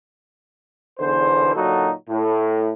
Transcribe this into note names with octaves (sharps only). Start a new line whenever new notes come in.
B1 E2 D3 E3 C5
A#2 D3 F#3 D#4 F#4 A4
A2